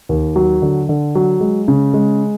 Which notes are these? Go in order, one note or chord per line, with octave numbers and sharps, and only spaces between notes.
D#2
F#3
D3
D3
F#3
G#3
C#3
G#3